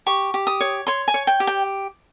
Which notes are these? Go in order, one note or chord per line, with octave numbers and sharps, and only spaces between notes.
G4 C#6
G4
D#6
C#5
C#5 C6
G#5
C#5
G5
G4
G5